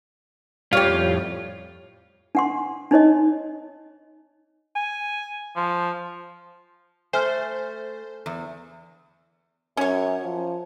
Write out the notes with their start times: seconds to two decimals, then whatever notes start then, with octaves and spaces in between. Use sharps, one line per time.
0.73 F2 A2 G3 C#4 F4 G4 C#5 F5
2.35 D4 F#5 C6
2.91 D4 D#4 C#5 D#5
4.76 G#5
5.56 F3
7.13 A3 C5 G#5 F6
8.26 E2
9.77 F#2 C#4 C#5
10.23 F3